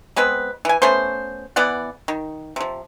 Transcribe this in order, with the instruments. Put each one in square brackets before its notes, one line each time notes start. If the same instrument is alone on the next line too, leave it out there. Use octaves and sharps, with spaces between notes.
[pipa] G#3 B3 C4 B4
E3 G#5
A3 B3 C#4 C5
E3 B3 D5 F#5
D#3
C3 F3